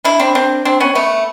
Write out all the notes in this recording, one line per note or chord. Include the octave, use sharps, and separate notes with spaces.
D4 E4
C4 D4
C4 D4
C4 D4
B3 C#4
A3 B3